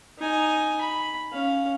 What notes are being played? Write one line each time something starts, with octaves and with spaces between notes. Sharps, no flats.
D#4 G#5
B5
C#4 F5